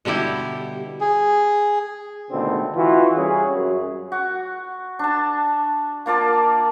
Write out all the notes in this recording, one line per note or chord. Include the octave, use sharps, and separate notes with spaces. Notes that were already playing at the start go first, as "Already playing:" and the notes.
B2 D3 G3 E4 G4
G#4
C#2 B2 D3 D#3 A3 C4
E3 F4 F#4
C3 G3 C#4 G#4
F#2
F#4
D4 A5
A#3 F4 D5 A5